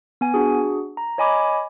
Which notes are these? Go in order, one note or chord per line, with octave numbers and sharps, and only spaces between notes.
B3 G#5
D4 F#4 G#4
A#5
C#5 D#5 G#5 B5 D6